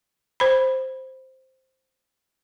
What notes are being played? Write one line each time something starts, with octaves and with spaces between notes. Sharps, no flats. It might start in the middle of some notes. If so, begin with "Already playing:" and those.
C5 B5